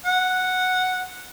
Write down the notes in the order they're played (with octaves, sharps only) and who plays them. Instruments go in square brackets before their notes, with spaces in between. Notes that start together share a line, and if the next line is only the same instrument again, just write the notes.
[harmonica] F#5